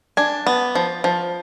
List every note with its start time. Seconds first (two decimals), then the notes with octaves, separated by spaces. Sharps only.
0.17 D4 G#5
0.47 B3
0.75 F3
1.04 F3